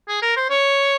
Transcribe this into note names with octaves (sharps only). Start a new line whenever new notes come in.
G#4
A#4
C5
C#5